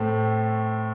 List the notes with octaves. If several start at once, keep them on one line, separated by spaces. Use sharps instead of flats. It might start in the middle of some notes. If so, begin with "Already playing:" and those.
Already playing: A2 A3 C4